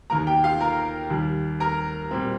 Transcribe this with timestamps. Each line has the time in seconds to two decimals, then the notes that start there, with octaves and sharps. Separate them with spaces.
0.10 D#2 D#3 A#3 A#4 A#5
0.27 G4 G5
0.44 F4 F5
0.61 A#4 A#5
1.10 D#2 D#3 G3
1.60 A#4 A#5
2.11 A#2 G3 C4